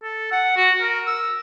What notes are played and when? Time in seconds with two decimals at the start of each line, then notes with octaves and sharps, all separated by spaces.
0.03 A4
0.32 F#5
0.57 F#4
0.81 A#4
1.07 E6